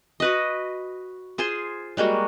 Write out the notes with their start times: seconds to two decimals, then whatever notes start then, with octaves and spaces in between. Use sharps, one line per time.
0.20 F#4 B4 D#5
1.38 F4 G#4 C5 C6
1.97 G3 G#3 A#3 F#4